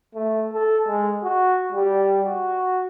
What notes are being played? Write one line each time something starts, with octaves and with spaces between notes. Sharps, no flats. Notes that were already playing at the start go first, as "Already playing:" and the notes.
A3
A4
G#3
F#4
G3
F#4